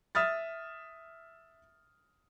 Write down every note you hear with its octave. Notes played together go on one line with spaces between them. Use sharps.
E5 D#6 F6 A6